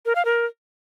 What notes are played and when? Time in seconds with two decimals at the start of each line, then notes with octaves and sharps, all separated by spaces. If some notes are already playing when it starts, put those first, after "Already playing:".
0.06 A#4
0.15 F5
0.25 A#4